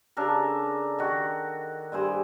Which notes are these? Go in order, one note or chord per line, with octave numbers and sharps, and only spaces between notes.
C#3 D4 A4 A#4
D#3 F#4
G2 E4 G#4 C5